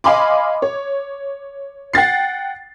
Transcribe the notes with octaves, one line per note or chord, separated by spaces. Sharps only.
D#5 F5 G#5 B5 C6 D6
C#5
F#5 G5 A6 C7